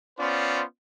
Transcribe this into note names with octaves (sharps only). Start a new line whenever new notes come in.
B3 C#4 F4 C5 D5